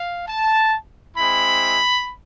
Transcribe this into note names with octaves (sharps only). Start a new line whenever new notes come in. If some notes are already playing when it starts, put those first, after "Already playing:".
Already playing: F5
A5
G#3 C4 E4 B5